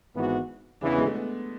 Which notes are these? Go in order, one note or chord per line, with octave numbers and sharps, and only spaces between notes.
G#1 G#2 E3 B3 F#4
E2 C#3 E3 D4
B3
G#3
A3
B3